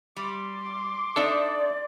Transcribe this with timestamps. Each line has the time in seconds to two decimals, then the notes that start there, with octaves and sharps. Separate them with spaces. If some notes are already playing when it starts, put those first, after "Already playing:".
0.17 G3 C6 D6
1.16 C4 D4 D#4 A4 D5 E5